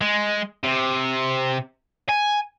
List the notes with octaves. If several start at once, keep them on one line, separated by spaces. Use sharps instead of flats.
G#3
C3
G#5